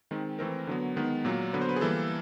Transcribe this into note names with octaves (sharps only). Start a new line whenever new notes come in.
D#3 G#3 C4
E3 A3 C4 A#4
D3 F#3 B3
D#3 G#3 B3
A#2 F#3 A#3
D3 F#3 B3 B4
C5
B4
G#4
E3 G3 A#3 A4